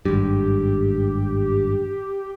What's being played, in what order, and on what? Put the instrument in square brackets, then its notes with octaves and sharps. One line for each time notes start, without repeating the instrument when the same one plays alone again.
[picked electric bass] G#1 G2 [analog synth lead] G4